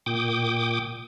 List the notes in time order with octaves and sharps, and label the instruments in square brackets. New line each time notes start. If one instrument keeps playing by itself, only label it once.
[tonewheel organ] A#2 G5 D6 D#6